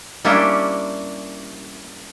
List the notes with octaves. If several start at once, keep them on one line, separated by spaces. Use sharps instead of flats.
G3 A#3 C#4 D4 E4 G4